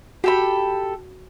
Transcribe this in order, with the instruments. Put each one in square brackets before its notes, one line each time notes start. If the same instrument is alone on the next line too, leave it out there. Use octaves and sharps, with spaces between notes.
[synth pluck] F#4 [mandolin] G4 A4 B5